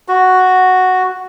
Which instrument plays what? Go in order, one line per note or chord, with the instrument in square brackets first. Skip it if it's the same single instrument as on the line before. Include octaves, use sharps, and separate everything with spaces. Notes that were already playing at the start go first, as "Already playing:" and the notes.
[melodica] F#4